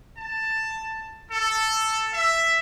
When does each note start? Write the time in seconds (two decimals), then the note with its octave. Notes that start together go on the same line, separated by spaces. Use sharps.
0.17 A5
1.30 A4
2.14 E5